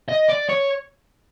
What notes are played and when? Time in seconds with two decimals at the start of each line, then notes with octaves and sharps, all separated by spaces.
0.09 D#5
0.29 D5
0.49 C#5